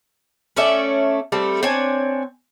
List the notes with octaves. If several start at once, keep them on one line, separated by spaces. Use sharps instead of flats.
A3 C#4 D5 E5
G3 A3 C4
C4 D4 C#5 G#5